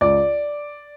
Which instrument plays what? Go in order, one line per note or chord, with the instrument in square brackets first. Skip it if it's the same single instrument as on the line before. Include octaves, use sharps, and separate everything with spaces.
[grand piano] C#2 D5